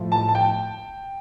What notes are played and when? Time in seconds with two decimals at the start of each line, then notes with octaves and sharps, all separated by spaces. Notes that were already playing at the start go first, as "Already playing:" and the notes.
Already playing: A2 F3
0.12 A5
0.28 A5
0.35 G5